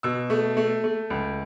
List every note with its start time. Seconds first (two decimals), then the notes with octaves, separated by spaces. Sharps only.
0.03 B2 E6
0.30 A3
0.57 A3
0.84 A3
1.10 C#2